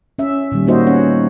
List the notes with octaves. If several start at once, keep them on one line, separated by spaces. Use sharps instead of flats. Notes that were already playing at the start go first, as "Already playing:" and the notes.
C#4 E5
A#2 D#3 G3
A#3 D#4 F#4 C5 D#5 E5
B3 C#4 C#5 F#5